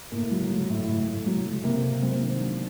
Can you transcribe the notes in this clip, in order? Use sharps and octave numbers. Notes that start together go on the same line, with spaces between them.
A2 A#3
F#3
F#3
A2
A2
A2
F#3
F#3
C3 A#3
C3
F#3 C4
A#3
D#3 C4
F#3 D4